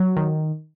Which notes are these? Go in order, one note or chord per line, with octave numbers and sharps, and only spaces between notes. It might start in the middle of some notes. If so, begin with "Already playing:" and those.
Already playing: F#3
D#3